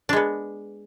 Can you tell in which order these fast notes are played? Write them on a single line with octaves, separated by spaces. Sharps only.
D4 G#3 B3